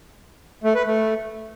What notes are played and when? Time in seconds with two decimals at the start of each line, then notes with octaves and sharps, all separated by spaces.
0.64 A3
0.75 B4
0.86 A3